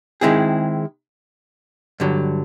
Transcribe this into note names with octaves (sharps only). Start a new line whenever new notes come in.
D#3 G#3 C4 E4 G#4
G2 D3 F#3